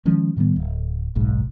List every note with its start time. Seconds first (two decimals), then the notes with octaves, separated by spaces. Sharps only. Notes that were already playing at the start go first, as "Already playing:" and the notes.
0.05 D#3 F3 G#3 C#4
0.36 A2 D#3 G3 B3
0.56 D1
1.15 F#1 B1 G#2